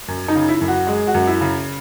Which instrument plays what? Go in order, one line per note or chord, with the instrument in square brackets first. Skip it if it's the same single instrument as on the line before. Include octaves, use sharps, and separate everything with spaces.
[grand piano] F#2
[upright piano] D#4
[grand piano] C#3
[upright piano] E4
[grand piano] F#2
[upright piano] F#4
[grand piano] G#3 [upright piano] G#4
[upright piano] F#4
[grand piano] F#2
[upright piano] E4
[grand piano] C#3